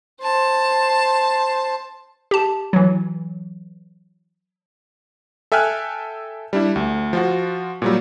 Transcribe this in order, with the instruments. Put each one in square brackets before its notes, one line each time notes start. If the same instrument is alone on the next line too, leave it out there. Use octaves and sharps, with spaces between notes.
[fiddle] C5 A5
[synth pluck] G4 A5
E3 F#3
[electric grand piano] A4 E5 G5 G#5 F6 F#6
G3 D4 E4
D2
F3 F4 F#4
A#2 F#3 G3